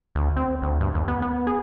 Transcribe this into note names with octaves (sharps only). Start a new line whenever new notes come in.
D2
C4
D2
G2
D#2
B3
B3
G#4